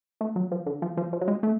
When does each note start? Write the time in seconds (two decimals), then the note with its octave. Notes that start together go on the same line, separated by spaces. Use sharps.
0.21 A3
0.36 F#3
0.51 F3
0.66 D3
0.82 F3
0.97 F3
1.13 F3
1.21 F#3
1.28 G#3
1.43 A3